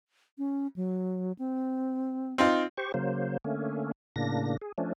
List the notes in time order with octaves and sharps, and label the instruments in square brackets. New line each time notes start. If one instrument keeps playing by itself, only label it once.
[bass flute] C#4
F#3
C4
[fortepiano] C4 D#4 F4
[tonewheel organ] G4 C5 C#6
C#3 F#3 A#3 C5
D3 A3 A#3 C#4
A2 C#3 A#3 D4 A#6
G#4
F3 A3 C#4 D4